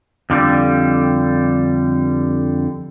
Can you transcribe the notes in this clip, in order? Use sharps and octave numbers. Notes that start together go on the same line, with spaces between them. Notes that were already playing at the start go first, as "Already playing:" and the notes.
F2 D3 G3